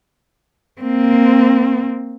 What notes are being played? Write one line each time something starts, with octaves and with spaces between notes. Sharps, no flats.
A#3 C4